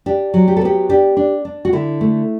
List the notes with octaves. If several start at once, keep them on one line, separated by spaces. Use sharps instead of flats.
D4 G4
F#3
G4
A4
B3 G4
D4 G4
D4
D4
F#4
D3 E4
A3